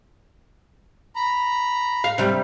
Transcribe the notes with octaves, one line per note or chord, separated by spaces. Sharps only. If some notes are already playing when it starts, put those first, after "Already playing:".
A#5 B5
F5
C3 G3